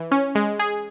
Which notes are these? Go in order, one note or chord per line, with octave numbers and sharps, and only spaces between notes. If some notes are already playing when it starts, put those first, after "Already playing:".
Already playing: E3
C#4
G#3
G#4